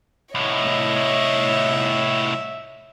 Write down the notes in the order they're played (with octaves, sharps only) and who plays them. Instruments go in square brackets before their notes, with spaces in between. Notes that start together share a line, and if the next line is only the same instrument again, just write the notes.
[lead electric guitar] C2 A2 [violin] C#5 D#5 [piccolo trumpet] E5